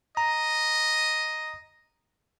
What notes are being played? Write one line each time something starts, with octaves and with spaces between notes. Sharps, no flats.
D#5 A#5